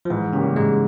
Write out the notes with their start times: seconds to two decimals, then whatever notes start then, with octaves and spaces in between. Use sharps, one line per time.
0.05 F3
0.10 G#2 E3
0.33 C#3 G3 A#3 C#4 G4
0.56 G#2 G#3